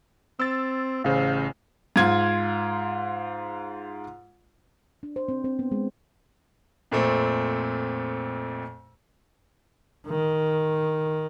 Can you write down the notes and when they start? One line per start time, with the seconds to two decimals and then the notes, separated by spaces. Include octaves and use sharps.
0.40 C4 E6 A6
1.04 A1 C#3 C5 F5
1.96 G#2 F4 G#6
5.03 D4
5.16 C5
5.29 C4
5.44 C4
5.59 B3
5.72 G#3
6.91 F2 A#2 A3 C4
10.07 D#3